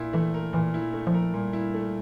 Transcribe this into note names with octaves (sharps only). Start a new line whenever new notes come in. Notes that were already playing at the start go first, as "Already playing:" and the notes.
Already playing: A#2 E4
E3 A3
A#4
A#2 E3
E4
A3
F3
A#4
A#2 G3
E4
A3